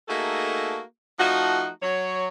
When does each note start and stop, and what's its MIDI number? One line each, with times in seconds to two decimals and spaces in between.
0.08 0.80 57
0.08 0.80 58
0.08 0.80 63
0.08 0.80 66
0.08 0.80 68
0.08 0.80 69
1.19 1.68 53
1.19 1.68 57
1.19 1.68 63
1.19 1.68 66
1.82 2.28 54
1.82 2.28 73